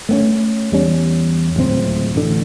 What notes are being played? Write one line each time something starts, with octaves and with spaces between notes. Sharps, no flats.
A3 B3 C#4
E2 G3 C#4
D1 C#2 C4
A1 D3